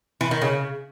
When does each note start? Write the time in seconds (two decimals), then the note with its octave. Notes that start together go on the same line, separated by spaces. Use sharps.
0.21 E3
0.31 D#3
0.42 C#3